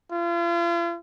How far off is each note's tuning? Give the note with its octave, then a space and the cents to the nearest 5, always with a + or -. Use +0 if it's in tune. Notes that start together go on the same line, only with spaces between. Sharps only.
F4 -40